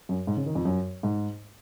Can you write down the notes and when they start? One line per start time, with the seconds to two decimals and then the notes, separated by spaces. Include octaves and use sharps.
0.09 F#2
0.27 G#2
0.37 C#3
0.46 D#3
0.55 F2
0.65 F#2
1.03 G#2